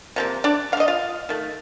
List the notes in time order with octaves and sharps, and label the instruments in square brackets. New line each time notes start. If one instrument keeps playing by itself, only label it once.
[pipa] C3 F3 A#3
D4 D5
D3 F5
A3
D#5
F4 F5
D#3 A3